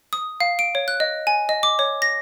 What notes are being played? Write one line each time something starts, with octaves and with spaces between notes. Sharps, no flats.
D#6
F5
D7
C#5
F#6
D#5
G#5
D#5
D6
C#5
A#6